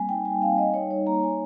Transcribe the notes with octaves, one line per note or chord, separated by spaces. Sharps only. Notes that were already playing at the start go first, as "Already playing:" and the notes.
Already playing: G3 A#3 C4 G#5
D#4 G5
G3 G#5
C4 F5
G3 D#5
D#4 C#5
D#4 C#5
A#3 A#5
A#3 G#5